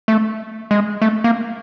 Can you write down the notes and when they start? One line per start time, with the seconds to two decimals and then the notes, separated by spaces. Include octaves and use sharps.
0.08 A3
0.71 G#3
1.02 A3
1.24 A#3